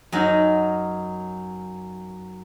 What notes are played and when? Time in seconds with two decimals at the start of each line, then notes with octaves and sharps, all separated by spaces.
0.12 F#2 D#4 A#5